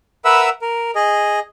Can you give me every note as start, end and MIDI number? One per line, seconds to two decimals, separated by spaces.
0.25 0.50 70
0.25 0.50 71
0.25 0.50 76
0.25 0.50 78
0.25 0.50 83
0.25 0.50 88
0.62 0.91 70
0.95 1.40 68
0.95 1.40 75